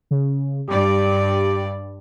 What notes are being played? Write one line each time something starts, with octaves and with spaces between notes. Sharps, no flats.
C#3
G2 G4 D5